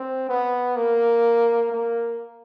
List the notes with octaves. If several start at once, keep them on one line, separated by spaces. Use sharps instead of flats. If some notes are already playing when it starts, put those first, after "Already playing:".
Already playing: C4
B3
A#3
A#3